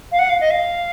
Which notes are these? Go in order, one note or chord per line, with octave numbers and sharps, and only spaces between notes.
F5
F#5
F5
D#5
F5